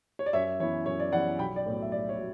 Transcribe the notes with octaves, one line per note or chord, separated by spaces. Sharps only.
C#5
D5
F#2 C#5 E5
E3 B3 E4 C#5
F#2 C#5
D5
E3 B3 E4 D5 F#5
B1 G5 B5
D5
A2 F#3 B3
E5
B1 D5
C#5
A2 F#3